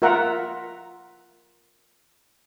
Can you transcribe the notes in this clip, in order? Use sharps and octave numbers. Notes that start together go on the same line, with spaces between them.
F4 A#4 E5 F#5 A#5